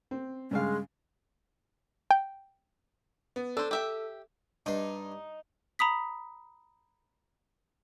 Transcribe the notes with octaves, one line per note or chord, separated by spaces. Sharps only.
C4
G2 C#3 G#3 F5
G5
B3
D4 A4 C5 E6
G4 E5 G5
G2 D4 D#4 C6
A#5 B5 D#6 B6